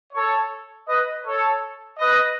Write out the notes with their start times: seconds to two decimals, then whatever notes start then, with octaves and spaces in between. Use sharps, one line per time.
0.13 A4 C#5
0.87 B4 D#5
1.24 A4 C#5
1.98 B4 D#5